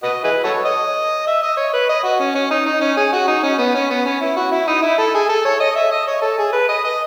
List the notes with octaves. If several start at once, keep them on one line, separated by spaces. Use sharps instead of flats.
F#4 B4 D#5
E4 G#4 B4
F#4 A4 C#5
D#5
E5
D#5
C#5
B4
D#5
F#4
C#4
C#4
D#4
D#4
C#4
G#4
F#4
D#4
C#4
B3
C#4
B3
C#4
E4
F#4
E4
D#4
E4
A4
G#4
A4
C#5
D#5
E5
D#5
C#5
A4
G#4
B4
D#5
D#5